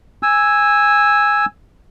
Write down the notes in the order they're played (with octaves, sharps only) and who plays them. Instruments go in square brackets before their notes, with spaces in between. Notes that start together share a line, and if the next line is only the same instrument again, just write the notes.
[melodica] G#5 E6